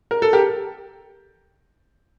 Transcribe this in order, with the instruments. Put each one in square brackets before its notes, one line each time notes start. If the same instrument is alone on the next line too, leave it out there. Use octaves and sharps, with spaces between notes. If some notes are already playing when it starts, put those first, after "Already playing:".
[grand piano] A#4
A4
G4 A#4